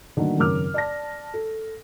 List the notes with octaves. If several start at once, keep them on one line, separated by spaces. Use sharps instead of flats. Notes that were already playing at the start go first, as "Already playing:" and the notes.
D3 D#3 F#3 A3 A#3
G#1 F#2 C#3 A#4 D6 F6
D5 A5 A#6
A4